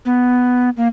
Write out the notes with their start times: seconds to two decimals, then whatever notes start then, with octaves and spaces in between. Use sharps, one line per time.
0.05 B3
0.77 A#3